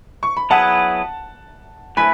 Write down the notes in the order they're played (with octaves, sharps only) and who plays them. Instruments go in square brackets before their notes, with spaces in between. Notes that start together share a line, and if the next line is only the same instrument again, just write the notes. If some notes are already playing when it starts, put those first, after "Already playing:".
[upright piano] C#6
B5
[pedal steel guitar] F#3 B3 E4 G#4 B4 [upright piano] F#5 A5
[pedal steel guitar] A3 E4 B4 [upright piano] G#5 B5